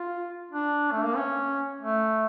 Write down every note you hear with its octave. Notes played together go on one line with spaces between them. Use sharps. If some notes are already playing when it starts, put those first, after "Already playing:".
Already playing: F4
D4
A3
A#3
C#4
A3